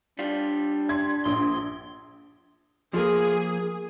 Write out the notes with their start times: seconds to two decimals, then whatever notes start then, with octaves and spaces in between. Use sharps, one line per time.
0.19 G3 D4 F4
0.89 C6 G#6
1.25 A#1 C6
2.94 F3 A#3 G#4